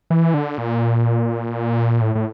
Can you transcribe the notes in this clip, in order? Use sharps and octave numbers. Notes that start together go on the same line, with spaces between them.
E3
D3
A#2
A2
A2